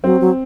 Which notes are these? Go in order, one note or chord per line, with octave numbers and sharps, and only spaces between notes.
F#3 C4
F#3